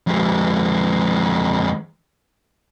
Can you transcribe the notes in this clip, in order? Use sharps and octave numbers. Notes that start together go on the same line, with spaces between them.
F2 G#3